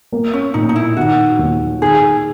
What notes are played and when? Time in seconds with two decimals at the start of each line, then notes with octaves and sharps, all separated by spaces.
0.12 A#3
0.33 C#4
0.54 A#2 D#4
0.69 D#4
0.76 E4
0.97 D#3 F#4
1.39 D#2
1.82 D#3 G#4